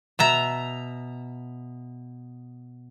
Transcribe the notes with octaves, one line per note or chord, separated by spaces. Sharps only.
B2 E5 A#5